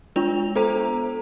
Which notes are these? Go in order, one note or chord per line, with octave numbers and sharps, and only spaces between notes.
G#3 D4 F4 F7
B3 A4 C5 A#5